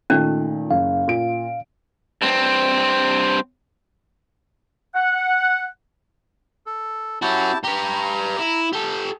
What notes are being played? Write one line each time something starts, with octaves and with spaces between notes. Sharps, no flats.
A#2 D#3 A3 C#4
F#1 F5
A#2 D7
G2 C4
F#5
A4
C#4 E4 F#4 G4 A5
G4 B4 A#5
E4
G4 A4